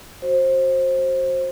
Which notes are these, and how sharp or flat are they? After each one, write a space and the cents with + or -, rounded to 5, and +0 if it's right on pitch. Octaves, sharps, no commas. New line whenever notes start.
F#4 +0 C5 +20